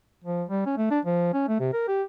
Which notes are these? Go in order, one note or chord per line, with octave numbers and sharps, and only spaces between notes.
F3
G3
C#4
A3
D4
F3
C#4
A3
C3
A#4
G4